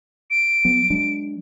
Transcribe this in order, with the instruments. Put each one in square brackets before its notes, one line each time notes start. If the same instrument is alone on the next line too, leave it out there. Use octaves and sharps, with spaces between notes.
[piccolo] D7
[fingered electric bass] F#3 B3
F#3 G#3 D4